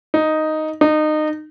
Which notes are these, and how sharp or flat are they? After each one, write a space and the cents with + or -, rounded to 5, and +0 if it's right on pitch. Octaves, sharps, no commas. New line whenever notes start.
D#4 +0
D#4 -25